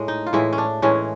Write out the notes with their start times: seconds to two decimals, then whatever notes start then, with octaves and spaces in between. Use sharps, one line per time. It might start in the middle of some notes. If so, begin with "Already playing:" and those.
Already playing: A2 G#3
0.08 D#4
0.27 F4
0.33 A2 E3 G#3 E4
0.53 C#4
0.58 D4
0.82 A2 E3 G#3 C#4